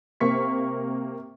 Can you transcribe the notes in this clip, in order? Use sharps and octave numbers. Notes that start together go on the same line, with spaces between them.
C3 A#3 C#6 B6